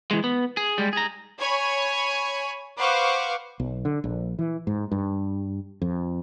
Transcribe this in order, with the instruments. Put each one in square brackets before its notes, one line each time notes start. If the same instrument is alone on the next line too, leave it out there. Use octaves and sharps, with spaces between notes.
[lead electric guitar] E3 G#3
B3
G#4
G3 G#3
G#4 A#5
[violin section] C#5 G#5 B5 C#6
B4 C5 F5 F#5 C#6 D6
[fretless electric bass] B1
D3
A#1
E3
G#2
G2
F2